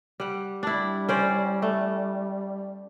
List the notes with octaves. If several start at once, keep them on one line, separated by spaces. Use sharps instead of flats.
G3 F#5
G3 D4 E4
C#4 C5 D5
A3